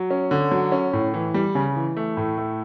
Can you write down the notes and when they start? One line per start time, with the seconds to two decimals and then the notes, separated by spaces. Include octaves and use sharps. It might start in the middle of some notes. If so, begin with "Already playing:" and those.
Already playing: F#3
0.11 C#4
0.31 D3
0.52 F#3
0.72 C#4
0.93 A2
1.14 E3
1.34 G3
1.55 C#3
1.76 E3
1.97 A3
2.17 A2
2.38 A3